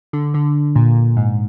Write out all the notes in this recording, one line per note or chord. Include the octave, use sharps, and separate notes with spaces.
D3
D3
A#2
G#2